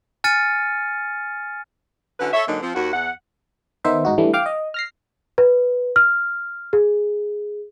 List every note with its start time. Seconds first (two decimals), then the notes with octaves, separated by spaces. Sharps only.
0.24 G#5 F6 A6 C#7 D#7
2.20 D3 C#4 E4 F#4 B4
2.33 A4 C#5 E5
2.47 G#2 D3 F#3 A#3 D#4
2.62 F3 C4
2.75 D#2 F#4
2.94 E2 F#5
3.85 D#3 B3 D#4 C5 E5
4.05 G#2 D#4 F#4
4.18 E3 G3 A3 D4
4.33 F5 G5 D6 F6
4.46 D#5
4.74 F6 A#6 C7
5.38 B4
5.96 F6
6.73 G#4